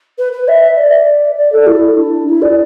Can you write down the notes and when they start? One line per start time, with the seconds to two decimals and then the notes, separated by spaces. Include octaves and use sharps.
0.18 B4
0.32 B4
0.48 E5
0.77 D5
1.37 D5
1.52 A4
1.66 E4
1.96 D4
2.27 E4
2.42 D5